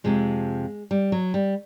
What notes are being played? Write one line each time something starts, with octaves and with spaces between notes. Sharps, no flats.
F2 C3 F3 G#3
G3
F#3
G3